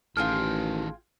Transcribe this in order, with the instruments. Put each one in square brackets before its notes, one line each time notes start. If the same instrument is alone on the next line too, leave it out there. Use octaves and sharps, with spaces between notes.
[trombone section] A1 [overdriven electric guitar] D#3 A4 [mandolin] F4 G#4 G5 [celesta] F6